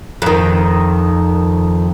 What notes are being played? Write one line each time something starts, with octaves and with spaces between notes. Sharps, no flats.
F2 D#3